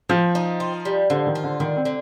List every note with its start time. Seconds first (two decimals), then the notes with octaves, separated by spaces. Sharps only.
0.09 F3 C4
0.35 D#4
0.60 F4
0.85 G3
1.10 D3 F3
1.27 D#3
1.35 F4
1.43 D3
1.60 D3 D#3
1.77 C4
1.85 D3